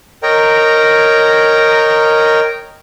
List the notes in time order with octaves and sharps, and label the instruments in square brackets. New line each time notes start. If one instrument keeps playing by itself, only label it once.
[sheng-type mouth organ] A#4 C#5 D#5 G5 A#5